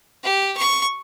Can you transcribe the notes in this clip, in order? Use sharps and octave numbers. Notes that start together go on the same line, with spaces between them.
G4
C#6